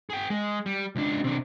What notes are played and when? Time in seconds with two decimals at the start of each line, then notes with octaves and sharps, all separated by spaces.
0.10 G#4 G5
0.30 G#3
0.66 G3
0.96 C#2 D4
1.24 C3 D4